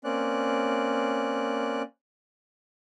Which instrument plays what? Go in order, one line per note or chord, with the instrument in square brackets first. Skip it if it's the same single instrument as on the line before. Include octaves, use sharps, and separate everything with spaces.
[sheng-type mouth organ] A#3 C4 C#4 D5 F#6